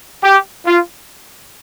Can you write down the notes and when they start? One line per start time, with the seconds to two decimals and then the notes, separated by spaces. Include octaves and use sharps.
0.23 G4
0.66 F4